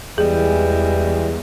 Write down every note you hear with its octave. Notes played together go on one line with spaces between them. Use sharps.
E2 E3 G3 G#3 G#4